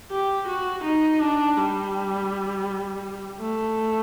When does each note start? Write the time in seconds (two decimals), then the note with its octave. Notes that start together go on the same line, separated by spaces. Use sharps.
0.11 G4
0.48 F#4
0.85 D#4
1.21 D4
1.57 G3
3.40 A3